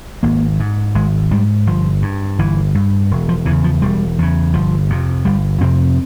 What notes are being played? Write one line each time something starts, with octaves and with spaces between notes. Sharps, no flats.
G#1 A#3
G#2
G#1 G#3
G#2 G3
G1 F3
G2
G1 E3
G2
E1
F3
E2 C#3 E3
F3
E1 G3
E2 C#3
G1 F3
F2 C3
G1 G3
F2 C3 C4